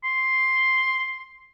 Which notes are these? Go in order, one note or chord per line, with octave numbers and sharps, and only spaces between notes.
C6